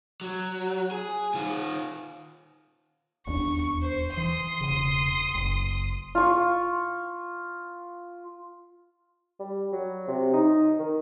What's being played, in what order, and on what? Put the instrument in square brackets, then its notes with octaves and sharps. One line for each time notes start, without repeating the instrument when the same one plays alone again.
[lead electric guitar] F#3
G#4
D#3 F4
[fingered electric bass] D#1 E2 D4 [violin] C#6
[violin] C5
[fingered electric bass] E3 [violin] C6 D#6
[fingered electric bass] E1 C#3
F#1
[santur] F4 C#6
[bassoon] G3
F#3
C3
D#4
D#3